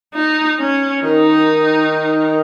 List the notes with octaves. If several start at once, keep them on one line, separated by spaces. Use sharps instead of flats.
D#4
C#4
D#3 D#4